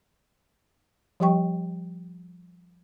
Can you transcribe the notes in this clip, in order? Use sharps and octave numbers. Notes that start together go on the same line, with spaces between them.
F3 G3 G4 D#5 G5 C#6